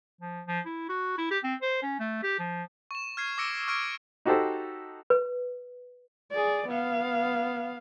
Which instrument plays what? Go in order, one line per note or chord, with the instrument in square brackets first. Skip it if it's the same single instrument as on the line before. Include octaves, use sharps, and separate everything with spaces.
[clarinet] F3
F3
E4
F#4
E4
G4
C4
C5
C#4
A3
G4
F3
[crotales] C#6 E7
F6 G#6 C7
D6 E6 A#6 C#7 D7
C#6 F6 G#6 D7
[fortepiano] D#4 F#4 G4 A4 C5
[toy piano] B4
[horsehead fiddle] G#4 D5
B3 F5